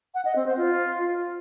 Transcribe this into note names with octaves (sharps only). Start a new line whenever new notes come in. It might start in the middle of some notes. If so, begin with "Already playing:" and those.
F#5
D#5
C4
C5
F4